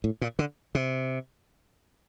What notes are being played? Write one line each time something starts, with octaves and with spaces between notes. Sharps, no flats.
A2
A#2
D3
C3